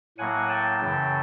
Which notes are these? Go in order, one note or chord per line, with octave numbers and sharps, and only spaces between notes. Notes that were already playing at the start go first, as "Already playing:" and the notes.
A2 F#3 A#3 F#5 G#5
G5 A5
F#2 C#3 E3